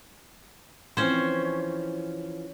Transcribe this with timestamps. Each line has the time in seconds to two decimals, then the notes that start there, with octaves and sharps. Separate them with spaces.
0.97 E3 F3 C4 C#4 C5